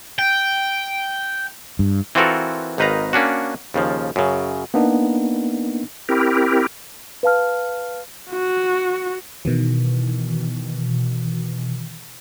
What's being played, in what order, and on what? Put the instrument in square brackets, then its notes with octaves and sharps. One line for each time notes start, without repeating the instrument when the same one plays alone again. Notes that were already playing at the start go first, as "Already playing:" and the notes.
[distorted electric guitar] G5
[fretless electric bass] G2
[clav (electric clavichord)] E3 C4 F4 F#4 A4 A#4
G#1 D#3 D#4 B4 F5 A#5
A#3 C#4 D4 F#4
D#2 C#3 F3
F#2 C#3
[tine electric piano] A#3 B3 D4 D#4
[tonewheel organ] C4 E4 G4 A#4
[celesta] B4 F5 A5 F6
[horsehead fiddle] F#4
[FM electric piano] B2 D#3 E3